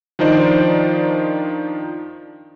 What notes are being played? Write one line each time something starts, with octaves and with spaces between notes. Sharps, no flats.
D#3 F3 D4 D#4 C5 D5